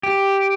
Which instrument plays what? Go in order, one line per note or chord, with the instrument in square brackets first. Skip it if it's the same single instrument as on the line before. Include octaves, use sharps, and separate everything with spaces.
[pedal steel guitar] G4